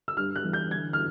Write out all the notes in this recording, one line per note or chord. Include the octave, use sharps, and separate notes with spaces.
E6
G2 F6
F#6
E3
G6
D3 G#6
F6